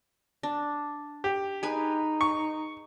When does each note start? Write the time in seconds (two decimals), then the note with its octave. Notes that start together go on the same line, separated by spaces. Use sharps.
0.43 D4
1.24 G4
1.63 D#4 G#4 B4 G#5
2.21 C#6